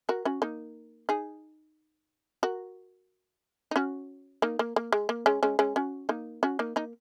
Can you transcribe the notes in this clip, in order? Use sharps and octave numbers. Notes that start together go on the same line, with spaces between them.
F#4 A#4
C#4 F#4
A#3 D#4
D#4 G#4
F#4 A#4
D#4
C#4 F#4
A#3 D#4
A#3
A#3
G#3
A#3
G#3 C#4
G#3 C#4
G#3 C#4
C#4 F#4
A#3 D#4
C#4 F#4
A#3 D#4
A#3 D#4